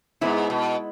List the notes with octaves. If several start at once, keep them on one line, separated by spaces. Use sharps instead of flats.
G#2 G#3 B3 E4
B2